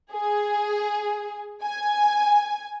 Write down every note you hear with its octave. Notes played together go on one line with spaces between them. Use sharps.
G#4
G#5